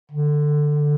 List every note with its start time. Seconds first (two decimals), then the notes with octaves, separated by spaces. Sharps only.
0.11 D3